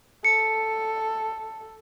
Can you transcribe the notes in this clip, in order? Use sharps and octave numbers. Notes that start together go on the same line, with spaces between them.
A4 C#7